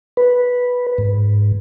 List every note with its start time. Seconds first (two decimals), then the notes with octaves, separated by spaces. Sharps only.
0.17 B4
0.98 G#2